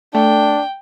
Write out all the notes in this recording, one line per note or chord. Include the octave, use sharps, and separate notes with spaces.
A3 D4 G5